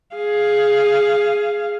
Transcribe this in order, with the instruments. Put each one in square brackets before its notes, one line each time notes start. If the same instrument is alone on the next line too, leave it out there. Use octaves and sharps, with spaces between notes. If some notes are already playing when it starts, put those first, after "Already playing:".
[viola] G#4 F5